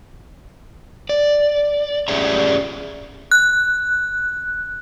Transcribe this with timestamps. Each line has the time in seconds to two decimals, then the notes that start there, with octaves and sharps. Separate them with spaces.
1.09 D5
2.08 C#4 G4 G#4 D5 E5 A#5
3.31 F#6